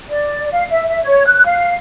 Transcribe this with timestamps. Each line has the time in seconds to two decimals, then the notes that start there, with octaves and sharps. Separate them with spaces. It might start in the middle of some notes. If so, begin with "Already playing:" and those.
0.09 D5
0.52 F5
0.69 E5
0.88 E5
1.03 C#5
1.26 F#6
1.45 F5